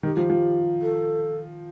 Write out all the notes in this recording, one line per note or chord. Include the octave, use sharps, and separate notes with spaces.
D#3 G4
F3
F3
A4